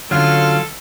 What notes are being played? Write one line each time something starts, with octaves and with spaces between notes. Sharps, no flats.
D3 F#3 C#4 F4 A4 F6